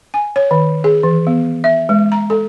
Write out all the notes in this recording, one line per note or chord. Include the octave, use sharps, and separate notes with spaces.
G#5
C#5
D#3
G#4
E3
B3
E5
G#3
A#5
A4